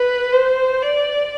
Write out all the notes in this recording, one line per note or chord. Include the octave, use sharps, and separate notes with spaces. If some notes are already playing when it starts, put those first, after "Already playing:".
Already playing: B4
C5
D5